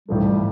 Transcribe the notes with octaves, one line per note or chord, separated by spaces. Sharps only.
A1 G#2 F3 G3 A3